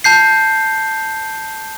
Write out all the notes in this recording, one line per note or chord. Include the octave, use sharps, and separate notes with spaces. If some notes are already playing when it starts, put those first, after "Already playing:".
A5 G6 C7